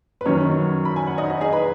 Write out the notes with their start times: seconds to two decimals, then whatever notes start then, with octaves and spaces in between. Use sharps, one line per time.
0.21 B4
0.26 F#2 D#3 F#3 C#4 C#5
0.85 B5
0.96 G#5
1.07 F#5
1.18 D#4 D#5
1.30 D#4 D#5
1.41 G#4 G#5
1.52 B4 B5